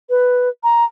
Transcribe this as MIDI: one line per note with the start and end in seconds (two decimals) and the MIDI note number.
0.10 0.49 71
0.63 0.84 82